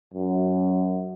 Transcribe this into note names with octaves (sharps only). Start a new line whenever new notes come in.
F#2